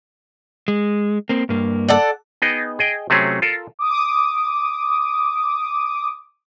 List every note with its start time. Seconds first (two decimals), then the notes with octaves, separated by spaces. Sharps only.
0.68 G#3
1.29 A#3 C4
1.49 G2 A#3
1.89 A4 D5 F#5
2.42 B3 D#4 G#4 D#5 G5
2.79 G#4 D#5 G5
3.10 C3 F#3 A3 C4 C#4 G#4
3.42 F4 A4 A#4
3.79 D6 D#6